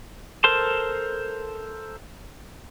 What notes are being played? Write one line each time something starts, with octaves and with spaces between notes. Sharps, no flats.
A4 A#4 C5 A5 C6